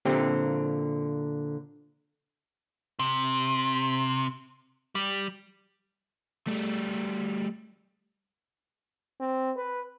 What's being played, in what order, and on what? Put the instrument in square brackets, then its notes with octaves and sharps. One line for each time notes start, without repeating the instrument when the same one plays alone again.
[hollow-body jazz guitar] A#2 D3 C4 G4
[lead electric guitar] C3
G3
[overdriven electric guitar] G3 A3
[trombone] C4
B4